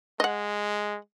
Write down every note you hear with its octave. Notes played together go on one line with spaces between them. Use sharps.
G#3 D#5 F#5